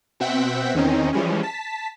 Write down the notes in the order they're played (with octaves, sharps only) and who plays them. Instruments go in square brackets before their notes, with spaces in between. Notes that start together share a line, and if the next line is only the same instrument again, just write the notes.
[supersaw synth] B2 C4 E5 F#5 G5 B6
E2 D#3 C4 C#4 D#4
E3 F3 G3 G#3 C#4
A5 B6